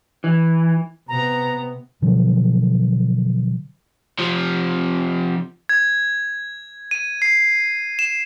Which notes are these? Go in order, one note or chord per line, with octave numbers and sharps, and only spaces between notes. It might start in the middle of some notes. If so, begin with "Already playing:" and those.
E3
C3 B3 A#5
B2 D3 F3 F#3
C3 F3
G#6
D#7
C7
E7